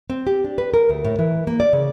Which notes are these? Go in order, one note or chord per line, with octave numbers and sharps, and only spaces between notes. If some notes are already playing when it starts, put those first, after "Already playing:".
C4
G4
D4
B4
A#4
D2
A2
E3
A#3
D5
C#3